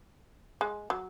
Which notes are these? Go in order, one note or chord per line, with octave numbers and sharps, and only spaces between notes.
G#3
F#3